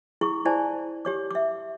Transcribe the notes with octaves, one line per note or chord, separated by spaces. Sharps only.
E4 G#4 C#6
E4 C5 D5 G#5 A5
G4 C#5 D6
E5 D6